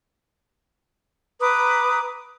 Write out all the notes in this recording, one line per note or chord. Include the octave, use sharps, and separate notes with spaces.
B4 A#5 D6 D#6